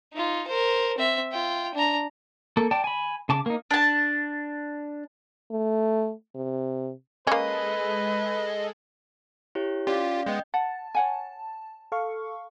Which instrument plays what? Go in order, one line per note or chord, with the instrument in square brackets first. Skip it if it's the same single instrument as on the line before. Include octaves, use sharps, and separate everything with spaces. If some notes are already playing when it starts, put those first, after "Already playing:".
[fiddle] D#4 F4
A#4 C5
C4 E5
F4 G5
D4 A#5
[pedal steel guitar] A#3 A4
D5 G5 A5
G#5 B5
C#3 A5 D6
A#3 D#4
[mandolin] D4 A5
[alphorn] A3
C3
[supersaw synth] G#3 G#4 A4 [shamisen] A#3 C#4 [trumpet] B4 [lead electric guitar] D#5
[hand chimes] E4 G4 C#5
[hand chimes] C#4 D5 F5 [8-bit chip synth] F4 G4
[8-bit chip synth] G#3 B3 [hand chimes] D#5 G5 G6
[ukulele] F#5 [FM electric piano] A5
[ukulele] C#5 F#5 G#5
[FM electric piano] A4 F5 C#6